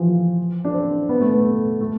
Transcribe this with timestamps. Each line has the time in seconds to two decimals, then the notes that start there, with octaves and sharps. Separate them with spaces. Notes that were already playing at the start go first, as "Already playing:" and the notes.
Already playing: E3 F3
0.65 D4
0.74 C4
1.09 B3
1.21 A3
1.32 B3
1.81 A3